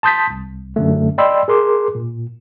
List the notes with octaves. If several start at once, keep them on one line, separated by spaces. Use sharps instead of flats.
A5 C6 D#6 G6 A6 B6
C2
F#2 D3 A3
D5 D#5 G5 B5 C6 E6
G#4 A#4 C6 D6
A#2